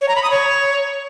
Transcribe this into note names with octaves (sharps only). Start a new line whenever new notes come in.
C#5
A#5
B5
D#6
C#5